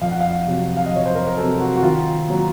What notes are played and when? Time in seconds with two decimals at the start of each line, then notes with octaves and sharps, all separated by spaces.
0.01 F2 F5
0.11 F#5
0.21 F5
0.47 C3 F#3
0.77 F5
0.86 D#5
0.93 F2 C#5
1.06 C5
1.15 A#4
1.27 A#4
1.37 C3 F#3 A4
1.61 F#4
1.76 F#4
1.83 D#3 F4
2.28 F#3 A#3